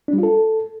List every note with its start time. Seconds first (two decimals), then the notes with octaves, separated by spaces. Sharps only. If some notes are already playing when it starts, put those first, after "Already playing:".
0.08 D4
0.13 G3
0.18 F4
0.23 A4